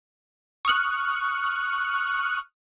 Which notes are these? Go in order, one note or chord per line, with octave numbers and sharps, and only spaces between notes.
C#6 D#6 F6 F#6